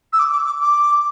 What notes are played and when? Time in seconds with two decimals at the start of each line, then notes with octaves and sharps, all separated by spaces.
0.12 E6
0.19 D6
0.32 D6
0.46 D6
0.60 D6